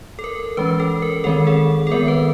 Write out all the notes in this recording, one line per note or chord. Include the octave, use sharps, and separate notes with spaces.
A4
A#4
E3 G#3 C#4 B4
A4
A#4
D#3 G#3 C4 A4
G#4
A4
D#3 G#3 B3 A#4
B4